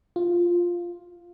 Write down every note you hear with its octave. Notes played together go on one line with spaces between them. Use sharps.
F4